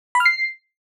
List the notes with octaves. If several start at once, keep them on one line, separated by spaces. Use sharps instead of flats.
B5
F6
C7